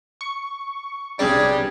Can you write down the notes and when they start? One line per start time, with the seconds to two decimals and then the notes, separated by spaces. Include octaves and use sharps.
0.21 C#6
1.19 B1 C3 G3 C#4 D4 G#4 D5